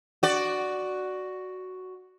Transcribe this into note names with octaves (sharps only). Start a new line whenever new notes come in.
F#4 D5